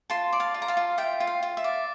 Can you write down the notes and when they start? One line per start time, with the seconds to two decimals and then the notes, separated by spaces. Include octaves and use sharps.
0.10 F4 A5 C6
0.33 D5
0.40 F5 A5
0.54 F4
0.62 A#5
0.68 F5 A5
0.77 F4
0.98 F4 E5 G5
1.20 F4
1.27 F5
1.43 F4
1.57 E5
1.64 D5